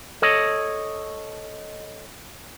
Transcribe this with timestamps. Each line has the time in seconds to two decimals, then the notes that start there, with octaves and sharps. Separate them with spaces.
0.22 A4 C#5 D#5